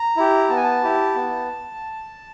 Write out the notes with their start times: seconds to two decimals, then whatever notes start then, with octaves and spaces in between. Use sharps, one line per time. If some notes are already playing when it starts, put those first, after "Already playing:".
Already playing: A#5
0.17 E4 G4
0.50 B3 A5
0.57 G#5
0.64 A5
0.83 E4 G4
1.16 B3